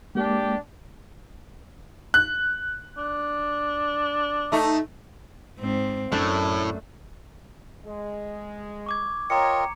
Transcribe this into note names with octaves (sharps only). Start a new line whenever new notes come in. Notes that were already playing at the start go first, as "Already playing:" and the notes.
G#3 A#3 D4 G4
F#6
D4
A3 D#4
G#2 C4
F#2 A2 A3 D4 E5
G#3
C#6 D6 G#6
F4 A#4 C#5 D#5 G5 A#5 C#7